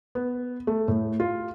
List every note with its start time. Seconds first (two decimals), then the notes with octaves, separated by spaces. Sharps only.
0.15 B3
0.67 A3
0.88 A2
1.20 F4